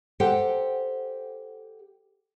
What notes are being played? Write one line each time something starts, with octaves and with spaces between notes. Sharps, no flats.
G4 A4 C5 F#5 G5